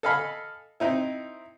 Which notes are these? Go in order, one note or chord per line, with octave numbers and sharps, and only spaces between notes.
A4 D#5 F5 G#5 B5
C4 D#4 E4